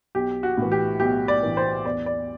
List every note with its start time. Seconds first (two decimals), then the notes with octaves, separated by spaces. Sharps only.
0.15 B1 G4
0.43 F#4
0.57 A2 E3
0.72 G4
1.00 B1 G4
1.28 D5
1.43 A2 E3
1.57 C5
1.85 E2 D5
2.06 D5